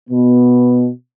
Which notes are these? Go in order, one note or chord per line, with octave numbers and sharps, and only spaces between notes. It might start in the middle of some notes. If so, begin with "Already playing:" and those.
B2 B3